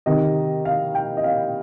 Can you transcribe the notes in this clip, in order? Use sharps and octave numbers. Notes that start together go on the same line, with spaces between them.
C3 D#3 D#5
F5
G5
D#5
F5